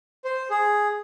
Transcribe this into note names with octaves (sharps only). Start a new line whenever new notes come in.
C5
G#4